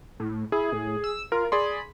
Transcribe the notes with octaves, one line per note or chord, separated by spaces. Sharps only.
A2
E4 G#4
A2
E6
F4 A#4
G#4 D5 B5 C6